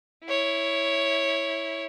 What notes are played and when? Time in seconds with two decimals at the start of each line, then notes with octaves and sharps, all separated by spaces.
0.25 E4 C#5